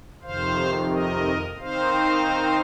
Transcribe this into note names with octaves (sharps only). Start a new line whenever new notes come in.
F2 C3 D#3 C5 F5
A#4 D#5
D#3 C4 D#4 C5 F5